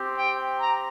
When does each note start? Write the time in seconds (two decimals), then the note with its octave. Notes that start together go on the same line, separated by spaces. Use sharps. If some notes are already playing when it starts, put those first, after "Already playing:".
Already playing: C4 G4
0.18 G5
0.60 A#5